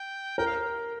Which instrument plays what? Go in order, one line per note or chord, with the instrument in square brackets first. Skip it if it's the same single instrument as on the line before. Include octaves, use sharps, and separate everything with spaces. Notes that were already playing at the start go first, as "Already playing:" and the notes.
Already playing: [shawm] G5
[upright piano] A#4 [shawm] G5
[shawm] F5